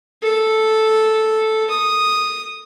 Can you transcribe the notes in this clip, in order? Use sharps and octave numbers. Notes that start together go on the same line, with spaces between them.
A4
D#6